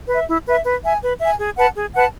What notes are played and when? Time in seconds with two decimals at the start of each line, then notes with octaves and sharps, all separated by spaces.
0.09 B4 E5
0.29 E4
0.46 B4 E5
0.65 B4
0.83 E5 G#5
1.03 B4
1.21 E5 G#5
1.39 G#4
1.57 B4 F#5 A5
1.76 G#4
1.95 B4 F#5 A5